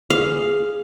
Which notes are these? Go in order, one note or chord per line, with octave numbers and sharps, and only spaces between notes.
G#4 F5